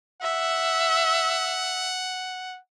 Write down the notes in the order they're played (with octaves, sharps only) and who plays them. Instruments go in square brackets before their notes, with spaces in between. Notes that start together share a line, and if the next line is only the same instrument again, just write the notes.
[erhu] E5 [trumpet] F#5